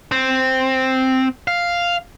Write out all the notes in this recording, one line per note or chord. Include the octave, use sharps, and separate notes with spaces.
C4
F5